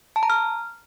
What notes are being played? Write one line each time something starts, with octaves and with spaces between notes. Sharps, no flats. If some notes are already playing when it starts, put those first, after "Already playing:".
A5
A#5
F6